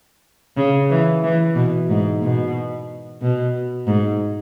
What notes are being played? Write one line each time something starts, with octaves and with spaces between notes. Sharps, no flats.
C#3
E3
E3
B2
G#2
B2
B2
G#2